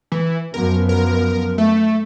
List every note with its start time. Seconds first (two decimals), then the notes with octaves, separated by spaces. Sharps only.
0.12 E3
0.54 F#2 F3 B3 A#4
0.89 A#4
1.58 A3